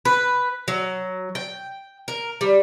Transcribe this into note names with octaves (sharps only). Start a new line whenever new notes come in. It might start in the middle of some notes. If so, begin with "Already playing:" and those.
B4
F#3
G5
A#4
G3